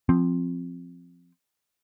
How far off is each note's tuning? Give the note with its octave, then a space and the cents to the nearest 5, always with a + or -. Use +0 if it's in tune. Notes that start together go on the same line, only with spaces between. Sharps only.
F3 +0 C4 +0